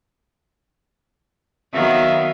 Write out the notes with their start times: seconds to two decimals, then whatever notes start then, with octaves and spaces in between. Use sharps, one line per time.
1.73 D#3 F#3 B3 E5 F5